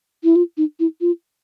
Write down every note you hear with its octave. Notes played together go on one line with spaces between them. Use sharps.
E4
F4
D#4
E4
F4